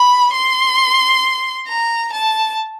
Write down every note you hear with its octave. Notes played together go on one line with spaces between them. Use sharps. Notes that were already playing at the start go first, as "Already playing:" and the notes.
Already playing: B5
C6
A#5
A5